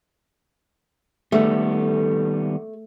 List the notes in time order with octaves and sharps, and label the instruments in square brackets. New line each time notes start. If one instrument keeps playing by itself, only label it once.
[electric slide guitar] D#3 G3 B3 [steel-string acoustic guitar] A3